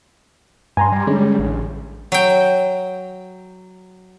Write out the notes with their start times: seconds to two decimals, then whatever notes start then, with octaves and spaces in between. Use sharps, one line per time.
0.77 G2 G#5 A#5 C6
0.92 G3
1.07 D3 G#3 C#4
1.39 A1
2.12 F#3 G5